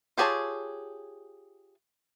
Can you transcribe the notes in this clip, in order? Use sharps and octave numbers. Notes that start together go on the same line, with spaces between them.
F4 G4 G#4 C#5 A5